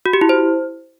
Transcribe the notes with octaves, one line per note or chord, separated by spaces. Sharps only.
F#4
G4
E4
C5